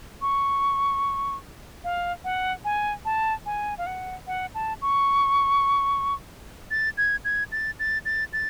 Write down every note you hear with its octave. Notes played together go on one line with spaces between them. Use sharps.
C#6
F5
F#5
G#5
A5
G#5
F5
F#5
F#5
A5
C#6
A6
G#6
G#6
A6
A6
A6
A6